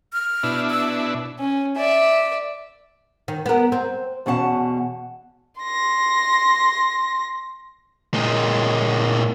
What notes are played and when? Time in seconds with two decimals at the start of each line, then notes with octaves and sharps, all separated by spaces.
0.13 F6
0.43 B2 D4 E4
0.70 E6
1.40 C#4
1.77 D5 E5
3.28 D#3
3.46 B3 A#4
3.72 C4
4.26 E2 B2 C#4 F#5 A5
5.61 C6 A#6
8.14 A#2 G#3